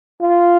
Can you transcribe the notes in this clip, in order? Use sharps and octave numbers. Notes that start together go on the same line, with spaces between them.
F4